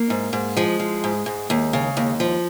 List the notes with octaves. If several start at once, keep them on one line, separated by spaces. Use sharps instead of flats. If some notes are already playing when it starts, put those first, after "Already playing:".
Already playing: A#3
G#2
G#2
F3 G#3
F3
G#2
G#2
D#2
C#3
D#2
F3